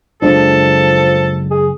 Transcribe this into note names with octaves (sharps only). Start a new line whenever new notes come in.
F#1 F3 G#3 D4 A4
G#4